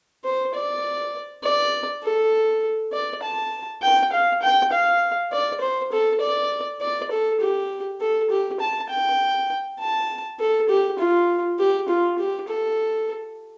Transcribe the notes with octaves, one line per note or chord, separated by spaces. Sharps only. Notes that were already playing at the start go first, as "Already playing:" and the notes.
C5
D5
D5
A4
D5
A5
G5
F5
G5
F5
D5
C5
A4
D5
D5
A4
G4
A4
G4
A5
G5
A5
A4
G4
F4
G4
F4
G4
A4